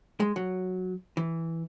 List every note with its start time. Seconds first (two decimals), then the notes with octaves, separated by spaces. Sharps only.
0.20 G#3
0.36 F#3
1.17 E3